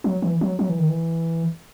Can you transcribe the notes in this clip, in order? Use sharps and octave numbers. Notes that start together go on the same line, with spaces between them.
F#3
E3
F#3
F#3
E3
D#3
E3